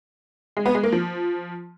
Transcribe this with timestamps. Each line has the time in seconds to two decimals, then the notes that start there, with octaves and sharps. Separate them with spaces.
0.57 G#3
0.66 B3
0.75 G#3
0.83 A#3
0.92 F3